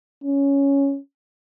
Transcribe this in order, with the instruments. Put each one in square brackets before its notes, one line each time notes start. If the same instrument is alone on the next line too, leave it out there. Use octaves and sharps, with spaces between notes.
[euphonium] C#4